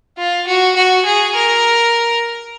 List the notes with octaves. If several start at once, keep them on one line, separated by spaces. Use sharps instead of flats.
F4
F#4
F#4
G#4
A#4